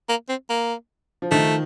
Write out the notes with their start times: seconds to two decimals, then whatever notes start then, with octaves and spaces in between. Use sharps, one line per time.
0.09 A#3
0.29 C4
0.50 A#3
1.22 F3
1.31 D#3 A3